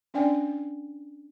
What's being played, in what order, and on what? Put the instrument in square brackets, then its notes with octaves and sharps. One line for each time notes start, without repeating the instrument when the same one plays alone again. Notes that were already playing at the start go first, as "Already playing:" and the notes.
[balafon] C#4 D4 D5 G5 G#5